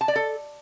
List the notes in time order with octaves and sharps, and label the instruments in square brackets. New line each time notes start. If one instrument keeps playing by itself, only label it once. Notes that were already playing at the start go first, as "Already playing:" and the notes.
[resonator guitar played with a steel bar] A5
D5
A4